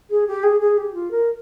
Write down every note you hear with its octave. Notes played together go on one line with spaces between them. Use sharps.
G#4
G4
G#4
G#4
G4
F4
A#4